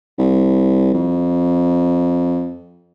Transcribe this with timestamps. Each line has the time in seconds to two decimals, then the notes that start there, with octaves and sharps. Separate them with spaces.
0.19 C2
0.94 F2